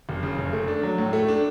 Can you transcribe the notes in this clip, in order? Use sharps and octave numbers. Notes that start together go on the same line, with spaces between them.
F#1
C#3
F#1
A3
D4
F#3
A2
A3
D4